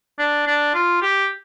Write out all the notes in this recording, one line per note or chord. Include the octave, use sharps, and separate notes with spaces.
D4
D4
F4
G4